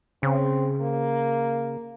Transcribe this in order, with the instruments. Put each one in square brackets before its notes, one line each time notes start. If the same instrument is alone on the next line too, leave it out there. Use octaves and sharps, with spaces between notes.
[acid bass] C#3 [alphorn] C4
[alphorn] A#3